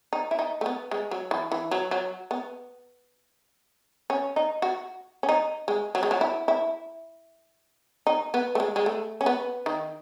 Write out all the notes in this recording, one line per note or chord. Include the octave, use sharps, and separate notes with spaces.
D#4
E4
D#4
A3
B3
G#3
F#3
E3
E3
F#3
F#3
B3
C#4
D#4
F#4
C#4
D#4
G#3
F#3
G#3
F#3
E4
E4
D#4
B3
A3
G#3
G#3
A3
C#4
B3
D#3